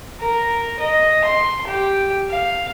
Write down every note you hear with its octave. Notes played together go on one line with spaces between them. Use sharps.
A#4
D#5
C6
G4
F5